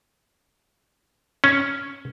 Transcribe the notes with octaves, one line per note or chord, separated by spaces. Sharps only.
C#4